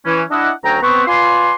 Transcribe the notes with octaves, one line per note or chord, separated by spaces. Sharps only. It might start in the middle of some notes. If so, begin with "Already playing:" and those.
E3 C#4
D4 E4 D#5 F#5
D2 F#3 C#4 G5 A#5
B3 C4 B4 C#6
F4 B4 D5 G#5 C6